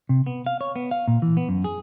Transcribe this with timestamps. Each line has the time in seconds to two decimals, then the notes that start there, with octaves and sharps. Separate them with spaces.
0.09 C3
0.26 B3
0.46 F5
0.61 C#5
0.76 B3
0.91 F5
1.08 A#2
1.22 E3
1.37 B3
1.49 F#2
1.64 G#4